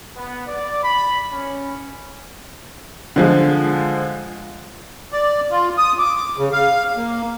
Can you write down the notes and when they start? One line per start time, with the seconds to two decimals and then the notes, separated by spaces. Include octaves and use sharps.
0.16 B3
0.47 D5
0.84 B5
1.32 C#4
3.16 D3 F3 G#3
5.12 D5
5.51 F4
5.78 D#6
5.99 D6
6.37 C#3
6.53 F5
6.97 A#3